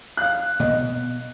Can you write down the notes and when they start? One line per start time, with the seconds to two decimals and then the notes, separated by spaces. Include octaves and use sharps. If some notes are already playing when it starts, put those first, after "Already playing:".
0.17 F5 F#6
0.60 B2 A#3 B3 D#5